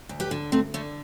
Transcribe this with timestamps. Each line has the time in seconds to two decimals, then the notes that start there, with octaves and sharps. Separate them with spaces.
0.09 D2
0.20 G4 B4
0.31 D3
0.52 D2 A3 C4
0.74 D3 A3